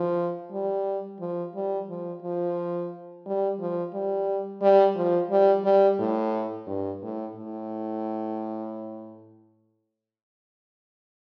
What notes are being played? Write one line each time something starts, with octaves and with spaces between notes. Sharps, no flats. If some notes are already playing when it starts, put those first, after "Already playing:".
Already playing: F3
G3
F3
G3
F3
F3
G3
F3
G3
G3
F3
G3
G3
A2
G2
A2
A2